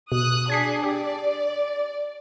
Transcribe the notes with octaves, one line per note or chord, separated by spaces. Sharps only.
B2 D#6 F#6
D4 G#4 G#6 B6 C7
G4 D5